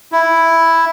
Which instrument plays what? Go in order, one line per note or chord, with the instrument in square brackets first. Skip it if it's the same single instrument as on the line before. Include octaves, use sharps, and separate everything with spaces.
[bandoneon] E4